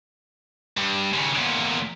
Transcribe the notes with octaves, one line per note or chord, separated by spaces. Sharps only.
G2
D#2 C#3
E2 A#2